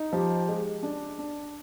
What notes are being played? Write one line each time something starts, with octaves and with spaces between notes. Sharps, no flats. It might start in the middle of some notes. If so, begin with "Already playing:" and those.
Already playing: D#4
F3 G4
G#3
D4
D4